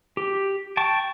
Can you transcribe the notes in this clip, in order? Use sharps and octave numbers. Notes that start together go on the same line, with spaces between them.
G4
G5 A5 C#6